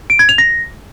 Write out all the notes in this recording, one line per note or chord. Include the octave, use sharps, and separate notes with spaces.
D7
G#6
F7
A#6